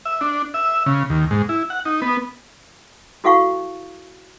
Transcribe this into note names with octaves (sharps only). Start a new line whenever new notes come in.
E5
D4
E5
C#3
D#2
G#2
E4
F#5
D#4
B3
E4 F#4 A4 F5 F#5 C#6